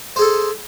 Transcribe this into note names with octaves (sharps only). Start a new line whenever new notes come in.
G#4 A4 C5